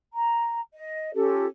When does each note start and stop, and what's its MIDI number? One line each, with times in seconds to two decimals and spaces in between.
0.13 0.60 82
0.73 1.14 75
1.14 1.46 61
1.14 1.46 65
1.14 1.46 67
1.14 1.46 69